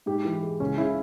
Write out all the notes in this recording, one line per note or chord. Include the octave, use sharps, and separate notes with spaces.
G#2 G4
E3
G#3
C#2 C#4
C#3 E4